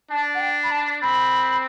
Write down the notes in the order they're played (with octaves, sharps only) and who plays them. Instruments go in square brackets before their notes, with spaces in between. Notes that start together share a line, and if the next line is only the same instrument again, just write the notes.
[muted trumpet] D4 [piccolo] A5
[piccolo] F#5
G5
B5
A5
[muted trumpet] C4 [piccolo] B5